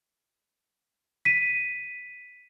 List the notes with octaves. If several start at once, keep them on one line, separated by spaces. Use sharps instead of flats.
B6 D#7